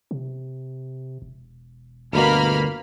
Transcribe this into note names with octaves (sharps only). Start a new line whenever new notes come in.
C3
E1
G1 D2 B2 A#3 B5 F6